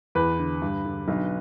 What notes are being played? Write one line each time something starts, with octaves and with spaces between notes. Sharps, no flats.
E2 B4
D3
G2
D3
B1